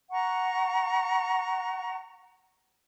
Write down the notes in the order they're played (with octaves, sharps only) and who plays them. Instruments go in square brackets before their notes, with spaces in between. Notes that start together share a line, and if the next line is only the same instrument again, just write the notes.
[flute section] F#5 A#5 C#6